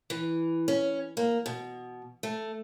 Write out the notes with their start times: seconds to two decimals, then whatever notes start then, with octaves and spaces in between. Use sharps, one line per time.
0.10 E3
0.68 C#4
1.17 A#3
1.46 B2
2.23 A3